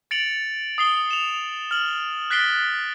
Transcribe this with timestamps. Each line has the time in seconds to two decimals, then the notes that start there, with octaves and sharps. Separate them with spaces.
0.11 A6 C#7 D7 F7 F#7
0.78 D#6 C7 G7
1.11 E7 F7
1.71 F6 F#7
2.30 F#6 A6 B6 C7 D7 G7